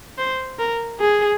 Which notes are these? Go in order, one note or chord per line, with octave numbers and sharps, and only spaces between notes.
C5
A#4
G#4